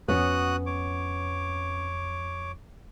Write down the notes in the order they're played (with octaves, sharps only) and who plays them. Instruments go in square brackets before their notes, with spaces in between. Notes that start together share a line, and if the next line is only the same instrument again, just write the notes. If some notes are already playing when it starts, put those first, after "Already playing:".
[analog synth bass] F2 [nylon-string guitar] B3 C#4 [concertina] F#4 D#6 F#6
[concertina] C#5 D6